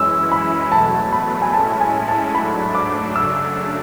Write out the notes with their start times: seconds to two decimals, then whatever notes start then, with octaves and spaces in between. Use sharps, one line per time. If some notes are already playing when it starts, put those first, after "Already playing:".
Already playing: F#2 E3 G#3 C#4 E4 E6
0.32 B5
0.72 E2 B2 F#3 A3 A5
1.13 B5
1.42 G#5
1.53 A2 G#3 C#4 E4 A5
1.80 G#5
2.08 A5
2.35 G#2 F#3 A3 D4 B5
2.75 D6
3.15 F#2 C#3 F#3 A3 D4 E6